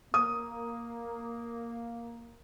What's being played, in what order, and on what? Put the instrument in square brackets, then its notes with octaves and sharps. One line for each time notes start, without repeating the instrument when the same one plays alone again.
[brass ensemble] A#3 [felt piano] D#6